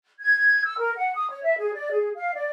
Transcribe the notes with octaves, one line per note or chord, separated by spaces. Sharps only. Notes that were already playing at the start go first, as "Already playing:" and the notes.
G#6
E6
A#4
F#5
D#6
C#5
E5
G#4
D5
G#4
F5
D5